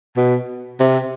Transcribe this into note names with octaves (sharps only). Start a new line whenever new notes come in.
B2
C3